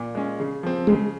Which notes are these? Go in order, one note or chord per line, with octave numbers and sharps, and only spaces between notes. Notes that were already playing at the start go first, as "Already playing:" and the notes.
Already playing: A#2
G#3 C#4
C#3
F3 C4
C#3 G#3